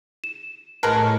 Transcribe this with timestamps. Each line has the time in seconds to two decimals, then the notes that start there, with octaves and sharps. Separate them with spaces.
0.24 E7
0.83 A2 G#3 A#4 B4 A5 C#6